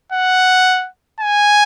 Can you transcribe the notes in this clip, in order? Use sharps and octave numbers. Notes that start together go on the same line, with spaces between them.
F#5
G#5